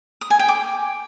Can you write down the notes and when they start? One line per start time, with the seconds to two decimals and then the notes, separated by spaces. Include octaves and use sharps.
0.21 D#6
0.30 G#5
0.39 G5
0.48 D6